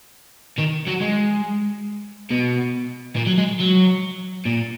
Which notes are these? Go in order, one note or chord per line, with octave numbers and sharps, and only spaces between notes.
D#3
F#3
G#3
B2
A#2
F#3
G#3
F#3
A#2